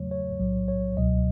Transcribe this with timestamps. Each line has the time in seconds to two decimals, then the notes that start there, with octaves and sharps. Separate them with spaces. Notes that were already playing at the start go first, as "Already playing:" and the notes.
Already playing: E2 C#3 F#3 A3 C#5
0.11 C#5
0.40 B1 A2 F#3
0.68 C#5
0.97 C#2 B2 F#3 D#5